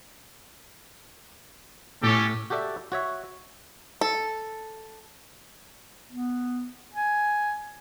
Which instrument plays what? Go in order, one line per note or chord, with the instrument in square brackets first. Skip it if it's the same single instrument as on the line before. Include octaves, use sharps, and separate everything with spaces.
[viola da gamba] A2 [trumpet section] C#4 G4 A4
[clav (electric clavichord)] F#4 G4 A4 D5 E5
F#4 C#5 E5
[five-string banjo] A4
[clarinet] B3
G#5